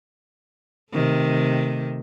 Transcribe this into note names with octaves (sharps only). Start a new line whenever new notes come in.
C3 D#3 A3